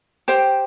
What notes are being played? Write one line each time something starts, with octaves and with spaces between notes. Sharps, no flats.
G4 C5 G5